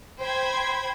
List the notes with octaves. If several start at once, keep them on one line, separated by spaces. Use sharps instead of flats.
C5 G5 B5 G#6